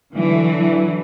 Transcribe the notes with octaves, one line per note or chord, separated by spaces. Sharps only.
D3 E3 F#3